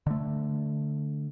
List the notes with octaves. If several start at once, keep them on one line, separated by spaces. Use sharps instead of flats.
D3 A3